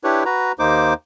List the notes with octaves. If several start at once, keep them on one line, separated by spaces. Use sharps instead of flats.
D4 E4 G4 B4 C#5
F#4 B4 A#5
D#2 A#3 D#4 C5 D6